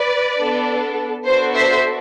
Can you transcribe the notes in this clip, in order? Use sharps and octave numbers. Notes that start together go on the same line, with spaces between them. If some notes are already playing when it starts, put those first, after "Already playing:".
Already playing: B4 D5
B3 D4 A4
B3 D4 F#4 A4 C5
C5 E5